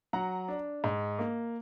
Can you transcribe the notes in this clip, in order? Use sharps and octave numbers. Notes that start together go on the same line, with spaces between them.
F#3 F#5 A#5
D4
G#2
A#3